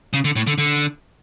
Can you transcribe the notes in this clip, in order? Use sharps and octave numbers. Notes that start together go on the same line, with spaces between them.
C#3
D3
A2
D3
D3